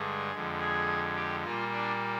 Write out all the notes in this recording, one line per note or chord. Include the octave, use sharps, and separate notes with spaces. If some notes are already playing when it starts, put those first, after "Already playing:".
Already playing: G2 D3 G#3 G#4
F2 D3 G#3
G#4
G4
A#2 G3 A#3 F4
D4